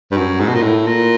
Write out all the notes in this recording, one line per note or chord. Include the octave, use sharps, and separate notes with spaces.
G2
F#2
G#2
B2
A#2
A2
A#2